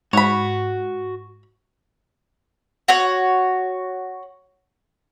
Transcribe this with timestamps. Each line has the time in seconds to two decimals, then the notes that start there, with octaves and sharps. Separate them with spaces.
0.13 G#2 F#4 C#5 B5
2.88 F#4 C#5